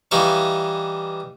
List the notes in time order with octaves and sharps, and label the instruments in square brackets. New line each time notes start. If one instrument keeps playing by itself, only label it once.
[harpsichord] E3 G3 D#4 E5 F5 C#6